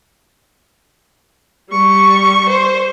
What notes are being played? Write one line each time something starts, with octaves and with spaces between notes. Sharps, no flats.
G3 C#6
C5